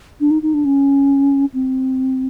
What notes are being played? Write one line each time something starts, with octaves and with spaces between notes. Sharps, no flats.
D4
D#4
D#4
D4
C#4
C4